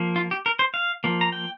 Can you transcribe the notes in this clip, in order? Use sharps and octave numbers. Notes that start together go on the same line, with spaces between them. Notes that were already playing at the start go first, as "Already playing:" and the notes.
Already playing: F3 A#3
F4
G4
A#4
C5
F5
F3 A#3
A#5
G5